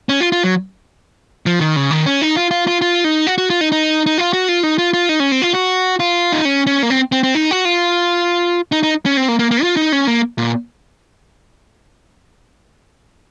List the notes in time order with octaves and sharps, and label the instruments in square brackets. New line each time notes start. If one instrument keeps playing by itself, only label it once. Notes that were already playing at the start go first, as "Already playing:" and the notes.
[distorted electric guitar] C#4
F4
F4
F#3
F3
D#3
C#3
D#3
C#4
D#4
F4
F4
F4
F4
D#4
F#4
F#4
F4
D#4
D#4
D#4
F4
F#4
F4
D#4
F4
F4
D#4
C#4
C4
F4
F#4
F4
D#4
C#4
C#4
A#3
C4
C4
C4
D#4
F#4
F4
D#4
D#4
C#4
C4
A#3
A#3
A#3
F4
D#4
C#4
A#3
A#2